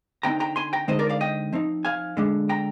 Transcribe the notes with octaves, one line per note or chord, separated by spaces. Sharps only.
D3 G#3 C4 D#4 G5 A#5
G5 A#5
G#5 C6
G5 A#5
D3 G#3 C4 D#4 C5 D#5
A#4 D5
D5 F5
D#5 G5
F3 C4 D#4
F5 G#5
D3 G#3 D4
G5 A#5